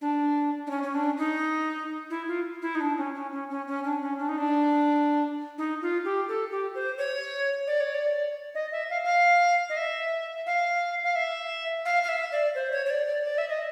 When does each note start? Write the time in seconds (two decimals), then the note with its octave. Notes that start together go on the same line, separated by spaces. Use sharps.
0.01 D4
0.67 D4
0.70 C#4
0.83 C#4
0.94 D4
1.18 D#4
2.10 E4
2.28 F4
2.62 E4
2.75 D#4
2.81 D4
2.98 C#4
3.15 C#4
3.32 C#4
3.50 C#4
3.67 C#4
3.84 D4
4.02 C#4
4.19 D4
4.29 D#4
4.38 D4
5.58 D#4
5.82 F4
6.05 G4
6.28 A4
6.51 G4
6.75 C5
6.98 C#5
7.67 D5
7.80 C#5
7.94 D5
8.55 D#5
8.72 E5
8.90 F5
9.05 F5
9.69 D#5
9.77 E5
10.46 F5
11.03 F5
11.16 E5
11.85 F5
12.03 F5
12.09 E5
12.32 D5
12.55 C5
12.72 C#5
12.86 C#5
12.90 D5
13.07 D5
13.24 D5
13.38 E5
13.49 D#5